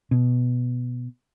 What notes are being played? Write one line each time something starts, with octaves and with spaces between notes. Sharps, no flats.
B2